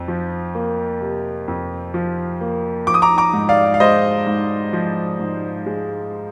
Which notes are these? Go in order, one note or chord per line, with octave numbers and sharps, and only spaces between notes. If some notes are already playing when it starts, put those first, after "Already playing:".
Already playing: F2
F3
A#3
C3
F2
F3
A#3
F3 D6
D#6
A#5 D6
A#5 D6
G#2
D5 F5
F5
G#3 C5 D#5
G#2
F3
G#2
G#3